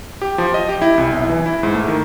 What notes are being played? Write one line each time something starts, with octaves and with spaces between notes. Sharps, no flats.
G4
F3
D#5
G4
E4
C2
B1
E3
E4
G#2
A3
D#3